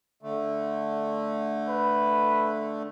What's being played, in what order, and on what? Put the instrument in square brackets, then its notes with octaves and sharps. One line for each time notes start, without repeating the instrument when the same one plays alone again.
[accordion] D3 A3
[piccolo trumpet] B4